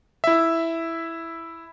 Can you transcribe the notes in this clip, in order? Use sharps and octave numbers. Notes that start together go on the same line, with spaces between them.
E4 E5